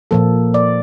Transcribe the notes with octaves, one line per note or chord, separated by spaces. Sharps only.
A#2 F3 A#3 A4
D5